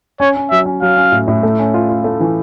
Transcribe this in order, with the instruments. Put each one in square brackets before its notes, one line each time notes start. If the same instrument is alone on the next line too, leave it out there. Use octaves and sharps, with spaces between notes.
[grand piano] C#4 [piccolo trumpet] C#5
[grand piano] C#4
[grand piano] F#3 [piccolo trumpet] E5
[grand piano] C#4
[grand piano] F#3 [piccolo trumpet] F5
[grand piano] C#4
A2
A2
A3
C#4
F4
F4
A3
E3